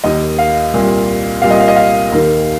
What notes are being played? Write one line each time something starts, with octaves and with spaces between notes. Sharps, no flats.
D#2 D#3 D#5
F5
C2 A#2
C2 A#2 F5
D#5
F5
D#5
F5
D#2 D#3